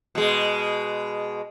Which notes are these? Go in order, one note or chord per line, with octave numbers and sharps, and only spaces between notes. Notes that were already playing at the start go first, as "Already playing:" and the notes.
B2 G#3